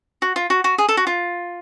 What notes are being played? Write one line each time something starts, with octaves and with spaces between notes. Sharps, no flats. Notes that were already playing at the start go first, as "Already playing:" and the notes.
F#4
F4
F#4
F#4
G#4
A4
F#4
F4